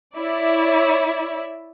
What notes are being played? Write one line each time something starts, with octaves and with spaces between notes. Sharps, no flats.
E4 C#5 D5 E5